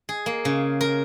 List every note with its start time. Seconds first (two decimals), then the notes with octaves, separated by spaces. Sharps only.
0.09 G#4
0.26 A#3
0.45 C#3
0.81 A#4